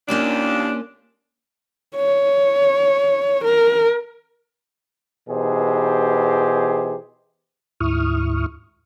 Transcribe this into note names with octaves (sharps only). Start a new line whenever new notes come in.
D#2 A#3 C#4 D4 F4
C#5
A#4
B2 E3 D#4 G4 G#4 C5
D2 G#2 E4 C#6 D#6 F6